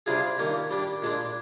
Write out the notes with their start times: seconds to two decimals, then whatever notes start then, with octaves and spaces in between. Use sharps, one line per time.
0.06 C3 G3 D4 F4 G#4
0.38 G2 D#3 A#3
0.70 G3 D4 G4
1.02 A#2 G#3 D4